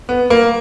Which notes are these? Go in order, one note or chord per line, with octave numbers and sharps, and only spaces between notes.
B3
A#3